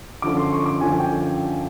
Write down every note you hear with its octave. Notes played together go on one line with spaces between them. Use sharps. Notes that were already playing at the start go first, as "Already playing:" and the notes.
F#2 D3 F3 D6
C6
C#6
D6
F#2 D3 F3 G#5
G5